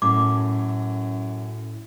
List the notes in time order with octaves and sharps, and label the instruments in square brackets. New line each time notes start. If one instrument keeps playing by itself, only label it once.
[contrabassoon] F#2 [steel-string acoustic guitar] A2 [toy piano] D6